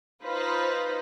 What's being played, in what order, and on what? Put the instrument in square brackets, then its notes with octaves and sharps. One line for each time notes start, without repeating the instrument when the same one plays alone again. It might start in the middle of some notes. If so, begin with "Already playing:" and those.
[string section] D#4 F4 B4 C5